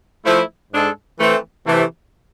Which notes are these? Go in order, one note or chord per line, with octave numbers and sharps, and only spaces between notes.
F3 A3 E4
G#2 G#3 D4 A4
E3 A3 C4
C3 E3 A3